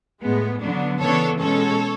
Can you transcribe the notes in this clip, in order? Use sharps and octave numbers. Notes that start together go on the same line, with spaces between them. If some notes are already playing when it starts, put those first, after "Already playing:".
A2 G#3 B3
D3 F#3 B3 D4
C#3 E3 B3 D4 A4 C#5
B2 G#3 C#4 A4 C#5